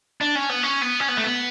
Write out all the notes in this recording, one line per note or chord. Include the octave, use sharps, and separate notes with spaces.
D4
C#4
B3
C#4
B3
C#4
B3
A3
B3